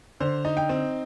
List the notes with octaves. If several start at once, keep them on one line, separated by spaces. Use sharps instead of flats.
D3 C5
D#4
G5
C4